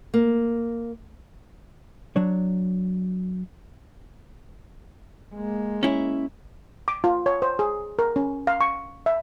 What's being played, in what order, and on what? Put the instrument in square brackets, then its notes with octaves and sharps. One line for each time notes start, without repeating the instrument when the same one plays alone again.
[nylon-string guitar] A#3
[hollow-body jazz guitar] F#3 D4 C#5
[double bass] G#3 A#3
[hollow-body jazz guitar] C#4 E4
[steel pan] D6
F4
C#5
C5
G#4
A#4
C#4
F5
C#6
E5